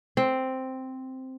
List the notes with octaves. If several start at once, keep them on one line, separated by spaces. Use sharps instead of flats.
C4